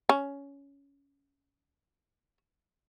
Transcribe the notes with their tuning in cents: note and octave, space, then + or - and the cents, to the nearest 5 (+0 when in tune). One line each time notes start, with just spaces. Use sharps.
C#4 +15